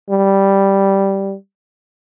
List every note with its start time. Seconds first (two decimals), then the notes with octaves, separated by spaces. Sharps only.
0.10 G3